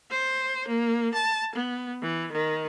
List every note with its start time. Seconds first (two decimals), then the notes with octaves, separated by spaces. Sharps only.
0.11 C5
0.68 A#3
1.14 A5
1.55 B3
2.02 E3
2.32 D#3